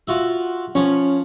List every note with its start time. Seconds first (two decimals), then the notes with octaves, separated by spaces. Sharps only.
0.08 F4 F#4 E5
0.75 F3 C#4 C#5